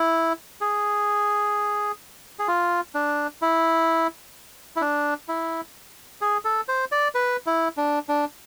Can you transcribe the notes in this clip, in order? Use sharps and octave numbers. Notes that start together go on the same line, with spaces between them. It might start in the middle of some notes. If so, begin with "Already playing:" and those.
Already playing: E4
G#4
G#4
F4
D4
E4
E4
D4
E4
G#4
A4
C5
D5
B4
E4
D4
D4